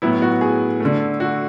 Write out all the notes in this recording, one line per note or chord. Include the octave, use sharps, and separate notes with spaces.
A2 F#3 B3 E4
F#4
G#4
D3 A3
F#4